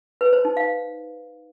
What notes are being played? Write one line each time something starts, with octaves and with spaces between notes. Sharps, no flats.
B4
C5
D#4
F5